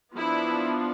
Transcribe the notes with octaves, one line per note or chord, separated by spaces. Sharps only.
F3 B3 D4 E4